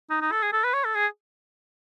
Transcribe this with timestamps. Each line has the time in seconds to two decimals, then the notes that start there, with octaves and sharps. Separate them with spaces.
0.10 D#4
0.21 D#4
0.32 A4
0.43 G#4
0.53 A4
0.64 B4
0.74 C#5
0.84 A4
0.95 G#4